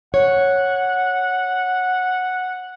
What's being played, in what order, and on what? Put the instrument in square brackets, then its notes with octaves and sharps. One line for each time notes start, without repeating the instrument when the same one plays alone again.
[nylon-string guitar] C#5 [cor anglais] F#5